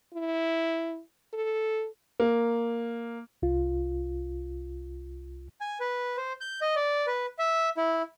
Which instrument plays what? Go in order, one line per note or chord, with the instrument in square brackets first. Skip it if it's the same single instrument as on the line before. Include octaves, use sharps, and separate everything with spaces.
[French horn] E4
A4
[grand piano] A#3
[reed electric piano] C2 F4
[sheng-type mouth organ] G#5
B4
C5
G6
D#5
D5
B4
E5
E4